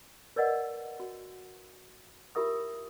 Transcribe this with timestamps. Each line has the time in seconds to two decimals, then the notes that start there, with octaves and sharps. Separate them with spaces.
0.36 A#4 B4 D5 D#5 F#5
1.00 F#4
2.35 E4 F4 G4 A#4 E5 D#6